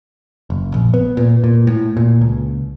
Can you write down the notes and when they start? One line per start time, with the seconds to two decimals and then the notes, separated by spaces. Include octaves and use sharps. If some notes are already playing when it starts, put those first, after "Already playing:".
0.50 F#1
0.74 A#1
0.94 B3
1.17 A#2
1.44 A#2
1.67 A2
1.97 A#2
2.21 C#2